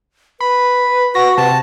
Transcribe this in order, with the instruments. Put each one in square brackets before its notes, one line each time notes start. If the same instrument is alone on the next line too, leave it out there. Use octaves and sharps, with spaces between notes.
[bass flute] B4 [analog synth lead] B5
[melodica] F#4 [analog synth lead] A#6
[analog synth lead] C3 [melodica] A5